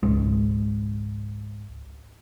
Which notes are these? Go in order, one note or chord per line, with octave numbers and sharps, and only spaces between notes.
G#1 C#2 G#3